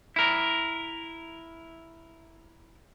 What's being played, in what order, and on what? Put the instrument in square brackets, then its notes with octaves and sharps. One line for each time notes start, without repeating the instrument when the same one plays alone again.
[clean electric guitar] E4 A#4